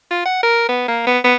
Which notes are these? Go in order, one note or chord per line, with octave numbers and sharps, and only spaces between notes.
F4
F#5
A#4
B3
A#3
B3
B3